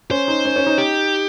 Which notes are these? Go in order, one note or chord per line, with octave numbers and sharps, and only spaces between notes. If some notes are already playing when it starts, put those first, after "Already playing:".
C#4 C5
D#4
C#4
C#4
D#4
G4